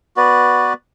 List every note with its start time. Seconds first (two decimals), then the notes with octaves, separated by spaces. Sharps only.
0.16 B3 F#4 B4 D5